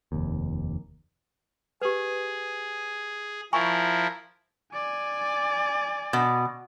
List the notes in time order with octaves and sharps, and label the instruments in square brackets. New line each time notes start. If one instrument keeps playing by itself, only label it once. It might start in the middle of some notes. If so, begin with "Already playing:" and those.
[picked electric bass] F1 D#2
[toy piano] G4 B4 [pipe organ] G#4
[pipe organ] F3 E4 A#4 [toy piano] G#5 B5 C#6
[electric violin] D5 G#5
[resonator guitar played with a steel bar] B2